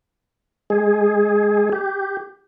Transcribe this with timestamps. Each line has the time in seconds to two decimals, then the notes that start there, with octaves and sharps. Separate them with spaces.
0.70 G#3 G#4
1.73 G4